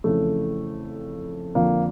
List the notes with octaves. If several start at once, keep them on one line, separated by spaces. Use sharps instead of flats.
F2 C#3 E3 A3
F2 D3 F3 A#3